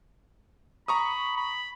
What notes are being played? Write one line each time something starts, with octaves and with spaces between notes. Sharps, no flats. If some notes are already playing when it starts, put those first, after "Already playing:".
A#5 B5 C#6 D#6
B5